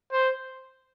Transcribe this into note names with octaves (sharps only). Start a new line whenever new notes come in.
C5